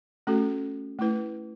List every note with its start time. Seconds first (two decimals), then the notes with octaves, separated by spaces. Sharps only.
0.27 A3 C#4 F#4 A4
0.99 A3 E4 B4